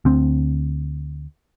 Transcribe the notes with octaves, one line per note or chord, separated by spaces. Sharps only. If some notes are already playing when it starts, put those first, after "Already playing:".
D2 C4